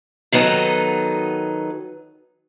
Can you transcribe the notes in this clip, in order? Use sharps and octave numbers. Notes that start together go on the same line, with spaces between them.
D#3 F#3 B3 D#4 A4